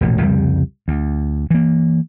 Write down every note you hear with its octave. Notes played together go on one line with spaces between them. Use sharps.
E1 A1 A#2
C2 F2 C#3 G3
D2
E3 A#3